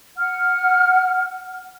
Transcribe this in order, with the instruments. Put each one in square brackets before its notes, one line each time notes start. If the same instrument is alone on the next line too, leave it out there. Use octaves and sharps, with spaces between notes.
[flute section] F#5 F6